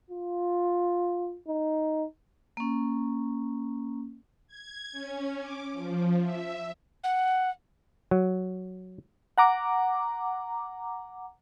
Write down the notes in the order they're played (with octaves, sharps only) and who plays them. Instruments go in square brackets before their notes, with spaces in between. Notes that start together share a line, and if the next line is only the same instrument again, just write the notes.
[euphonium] F4
D#4
[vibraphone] A#3 C#4
[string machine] G#6
C#4
D6
F3
E5
[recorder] F#5
[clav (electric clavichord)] F#3
[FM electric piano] F#5 A#5 D6